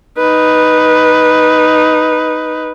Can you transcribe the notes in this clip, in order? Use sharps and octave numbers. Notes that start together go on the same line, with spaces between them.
D#4 B4